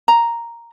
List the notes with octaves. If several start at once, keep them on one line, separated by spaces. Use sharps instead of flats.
A#5